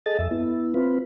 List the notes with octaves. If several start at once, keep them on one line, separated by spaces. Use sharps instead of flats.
G#4 A4 D#5 A6
F2 E5
B3 E4
C4 F4 B4